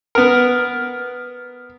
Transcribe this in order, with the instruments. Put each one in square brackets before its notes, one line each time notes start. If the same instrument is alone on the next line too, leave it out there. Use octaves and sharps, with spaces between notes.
[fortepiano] B3 A#4